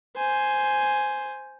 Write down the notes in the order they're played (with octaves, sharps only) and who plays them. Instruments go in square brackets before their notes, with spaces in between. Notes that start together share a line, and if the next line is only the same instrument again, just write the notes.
[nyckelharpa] C5 G#5